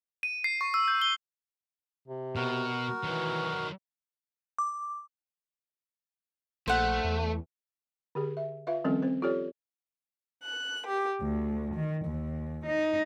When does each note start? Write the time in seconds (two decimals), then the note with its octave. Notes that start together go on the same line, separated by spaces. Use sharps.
0.23 D#7
0.44 C7
0.61 C#6
0.74 E6
0.88 G6
1.02 G7
2.08 C3
2.36 B2 F#4 A#4
3.04 D#3 E3 F#3
4.58 D6
6.68 A#1 A3 C5 F#5
7.04 E2
8.15 D3 G4 G#4
8.37 E5
8.67 F4 B4 E5 F5
8.84 D#3 F3 G3 C4 C#4 A4
9.02 C4 C5
9.22 F4 G4 A4 C#5 D5
10.43 F#6
10.86 G4
11.21 D2
11.75 D#3
12.06 D#2
12.65 D#4